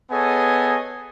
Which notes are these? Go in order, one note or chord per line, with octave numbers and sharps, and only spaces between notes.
B3 G#4 A4 C#5 D#5 G#5